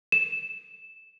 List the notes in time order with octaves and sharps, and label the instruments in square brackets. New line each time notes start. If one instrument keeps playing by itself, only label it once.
[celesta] E7